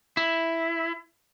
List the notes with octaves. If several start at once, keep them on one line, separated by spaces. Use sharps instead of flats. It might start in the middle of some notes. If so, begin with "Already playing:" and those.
E4